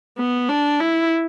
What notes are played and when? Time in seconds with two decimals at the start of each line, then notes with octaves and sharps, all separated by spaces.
0.18 B3
0.49 D4
0.80 E4